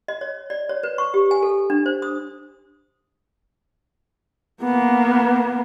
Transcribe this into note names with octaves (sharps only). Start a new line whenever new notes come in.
D#5
C#5
D5
C#5
B4
C#6
G4
G#5
A4
D4
C5
D#6
A#3 B3